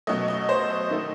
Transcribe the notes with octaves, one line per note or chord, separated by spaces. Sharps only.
B2 F#3 A3 D#5
D#5
C5
D#5
D#3 A3